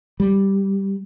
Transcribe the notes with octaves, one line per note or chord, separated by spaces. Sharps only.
G3